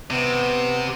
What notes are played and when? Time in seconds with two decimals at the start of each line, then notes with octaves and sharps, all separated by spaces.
0.11 C3 B3